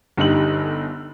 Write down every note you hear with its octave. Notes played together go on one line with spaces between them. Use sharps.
G1 D3 D#4 G4 F#7